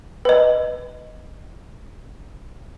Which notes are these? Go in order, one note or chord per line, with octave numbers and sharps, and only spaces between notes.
B4 D#5